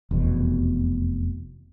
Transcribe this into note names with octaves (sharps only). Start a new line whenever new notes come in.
F1 E2 B2